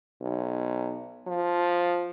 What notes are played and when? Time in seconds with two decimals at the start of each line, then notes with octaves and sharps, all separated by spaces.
0.21 B1
1.27 F3